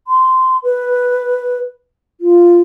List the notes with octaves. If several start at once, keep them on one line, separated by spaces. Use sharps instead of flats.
C6
B4
F4